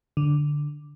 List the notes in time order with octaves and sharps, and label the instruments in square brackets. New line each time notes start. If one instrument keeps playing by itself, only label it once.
[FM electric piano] D3